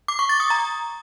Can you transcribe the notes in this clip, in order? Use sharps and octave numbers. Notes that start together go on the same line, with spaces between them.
D6
C#6
A6
D#6
A#5